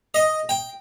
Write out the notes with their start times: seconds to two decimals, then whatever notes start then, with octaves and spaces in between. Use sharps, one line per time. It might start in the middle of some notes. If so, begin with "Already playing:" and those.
0.14 D#5
0.49 G5